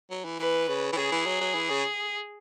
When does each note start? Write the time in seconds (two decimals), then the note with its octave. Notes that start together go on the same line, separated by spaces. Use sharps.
0.11 F#3
0.25 E3
0.39 E3 B4
0.68 C#3
0.93 E3
0.97 C#3 G#4
1.12 E3
1.26 F#3
1.41 F#3
1.55 E3
1.70 C#3